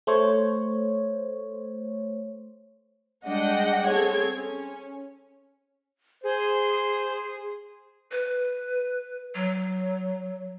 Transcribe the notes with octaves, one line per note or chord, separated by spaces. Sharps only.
A3 C5 C#5
G3 G#3 D4 D#5 F#5 G5
C4 G#4 A4 C#5 G#6
C#4
G#4 C5
B4
F#3